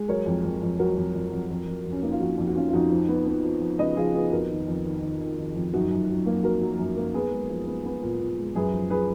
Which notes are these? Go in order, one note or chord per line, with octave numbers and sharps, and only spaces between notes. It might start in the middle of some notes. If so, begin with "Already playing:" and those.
Already playing: G#3
F#3 A#4 C#5
F2
F2
F2
F#3 F#4 A#4
F2
F2
F2
F2
F2
F2
C#4
A#3 D#4
F4
F2 D#4 F#4
F2
F#4
F2 C#4 F4
F4
F2 D#4 F#4
F3
B3
B3
F3
F3
C#3 B4 D#5
F3 F4 G#4
B3 F4 G#4
F2 F#4 A#4
D#3
F2
D#3
D#3
D#3
D#3
F2
F#2 D#4 F#4
F#2
F#3
A#3
F#3 F#4 A#4
F#3
F#2
A#3
B3 G#4 B4
G#3
F3
B3
B3
A#2
A#2
G#3
F#2 G#4 B4
F3
G#4 B4